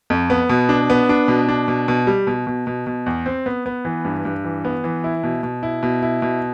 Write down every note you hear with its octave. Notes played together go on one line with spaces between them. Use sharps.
F2
B3
B2
D4
B3
D4
B2
D4
B2
B2
G3
B2
B2
B2
B2
E2
C4
B3
B3
E3
G2
G2
E3
B3
E3
E4
B2
B2
E4
B2
E4
B2